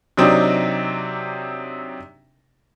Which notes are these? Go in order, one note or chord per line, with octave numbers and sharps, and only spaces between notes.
C3 F#3 C4 D4 D#4